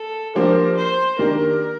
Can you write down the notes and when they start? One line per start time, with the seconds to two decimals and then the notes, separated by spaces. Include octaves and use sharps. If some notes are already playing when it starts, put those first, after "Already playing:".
Already playing: A4
0.35 F3 A#3 D4 G4 A#4 C5
0.77 C5
1.18 D#3 A#3 D4 G4 A#4